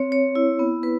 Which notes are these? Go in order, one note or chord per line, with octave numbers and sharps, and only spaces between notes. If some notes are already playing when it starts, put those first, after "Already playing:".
Already playing: C4 C#5
C#5
E4
B3
B4